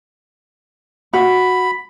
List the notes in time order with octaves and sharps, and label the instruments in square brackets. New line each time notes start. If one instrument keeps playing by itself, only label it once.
[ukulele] F#4 [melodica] B5